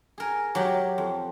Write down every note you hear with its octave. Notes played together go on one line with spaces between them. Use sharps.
G#4 A#4 G#5
F#3 G4 A#4
F2